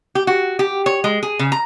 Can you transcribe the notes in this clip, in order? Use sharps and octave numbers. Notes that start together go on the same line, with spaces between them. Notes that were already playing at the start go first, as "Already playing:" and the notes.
G4
F#4
G4
C#5
G#3
G#4
C#3
A#5